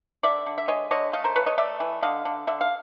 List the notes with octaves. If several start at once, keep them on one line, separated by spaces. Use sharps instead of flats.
D3 D5 E5
D3
E5
G#3 C#5 D#5
D3 C#5 D#5
A3 D#5 F5
A#4 C5
E3 B4 C#5
C#5 D#5
A3 D5 E5
E3
D3 D#5 F5
D3
D3 E5
F5